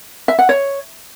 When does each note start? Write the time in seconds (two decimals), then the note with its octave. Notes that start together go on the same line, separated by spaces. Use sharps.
0.28 E5
0.39 F#5
0.49 C#5